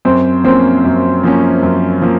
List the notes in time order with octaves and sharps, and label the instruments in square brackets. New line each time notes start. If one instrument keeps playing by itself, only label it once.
[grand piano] F#2 [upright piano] C4
[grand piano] F3 A#3 C#4 [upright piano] C4
[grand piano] F#2
F3 A#3 C#4
F#2
F3 A#3